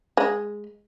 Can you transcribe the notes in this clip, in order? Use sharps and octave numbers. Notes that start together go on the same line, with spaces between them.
G#3